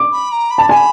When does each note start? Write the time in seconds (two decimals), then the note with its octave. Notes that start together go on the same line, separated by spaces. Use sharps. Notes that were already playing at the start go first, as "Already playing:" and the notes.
Already playing: D6
0.12 B5
0.32 A#5
0.50 B5
0.58 A5
0.69 G#5 C6
0.74 B5